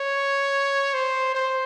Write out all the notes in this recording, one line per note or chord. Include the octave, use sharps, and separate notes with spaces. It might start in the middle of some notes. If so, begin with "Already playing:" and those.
Already playing: C#5
C5
C5